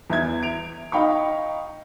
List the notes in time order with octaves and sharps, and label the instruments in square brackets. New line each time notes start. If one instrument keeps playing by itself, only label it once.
[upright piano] E2 E5 G#6
D7 F7
D#4 F5 G5 B5 C#6